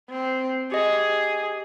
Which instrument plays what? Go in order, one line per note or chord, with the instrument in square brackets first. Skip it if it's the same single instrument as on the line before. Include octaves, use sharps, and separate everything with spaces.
[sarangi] C4
[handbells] G4 D#5 [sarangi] G#4